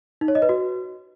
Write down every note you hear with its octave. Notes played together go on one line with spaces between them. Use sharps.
D#4
C#5
D#5
B4
F#4